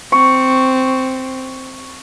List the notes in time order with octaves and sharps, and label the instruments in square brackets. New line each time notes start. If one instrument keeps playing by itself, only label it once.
[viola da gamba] C4 [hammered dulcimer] C#6